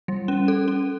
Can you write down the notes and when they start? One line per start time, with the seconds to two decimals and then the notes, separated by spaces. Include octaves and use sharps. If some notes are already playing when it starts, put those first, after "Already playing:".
0.08 G3
0.28 C#4
0.48 A4
0.68 C#4